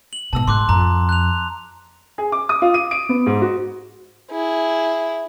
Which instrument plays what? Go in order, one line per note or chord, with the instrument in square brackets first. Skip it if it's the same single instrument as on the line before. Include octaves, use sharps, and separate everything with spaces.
[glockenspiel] F#7
[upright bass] G#2 B2 [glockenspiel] A5 E6
[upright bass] G#2 [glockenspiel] C6 D6 F#6
[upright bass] F2 [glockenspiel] A#5
[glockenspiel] F#6 F7
[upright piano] G#4
D6
D#6
F4
D#7
D7
B3
G#2
F#4
[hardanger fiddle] E4 G#4